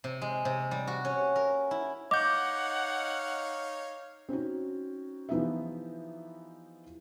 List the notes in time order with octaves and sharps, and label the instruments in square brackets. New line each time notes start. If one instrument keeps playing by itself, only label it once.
[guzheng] C3
G#3
C3
G3
F#4
C#4
A#4
E4
[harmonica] D#4 C#5 F5 [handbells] D#5 G6 [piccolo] F#5 [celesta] D6
[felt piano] C4 C#4 D#4 F#4
E3 F3 B3 D#4 G4 E5